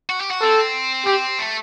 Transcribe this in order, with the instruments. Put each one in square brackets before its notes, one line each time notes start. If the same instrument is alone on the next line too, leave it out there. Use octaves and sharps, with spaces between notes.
[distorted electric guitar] F#4
G4
F#4
[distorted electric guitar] C4 [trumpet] A4
[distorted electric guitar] C4 [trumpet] G4
[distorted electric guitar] A3